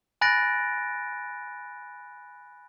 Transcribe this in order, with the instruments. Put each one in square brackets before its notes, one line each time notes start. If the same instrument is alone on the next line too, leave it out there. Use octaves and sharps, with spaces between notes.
[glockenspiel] G#5 B5 F#6 A6 A#6 D7